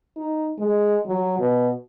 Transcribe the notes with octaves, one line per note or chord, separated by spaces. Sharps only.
D#4
G#3
F#3
B2